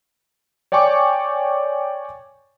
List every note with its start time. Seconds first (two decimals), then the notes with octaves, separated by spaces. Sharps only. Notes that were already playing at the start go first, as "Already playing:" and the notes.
0.72 C#5 D5 G5 G#5 C#6 D6